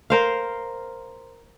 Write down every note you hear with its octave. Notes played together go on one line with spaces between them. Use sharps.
A#4 C5 F5